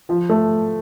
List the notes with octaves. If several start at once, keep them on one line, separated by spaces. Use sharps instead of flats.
F3
A3